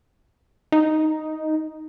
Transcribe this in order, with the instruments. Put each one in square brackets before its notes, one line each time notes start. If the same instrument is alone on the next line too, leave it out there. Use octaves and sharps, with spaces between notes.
[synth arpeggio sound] D#4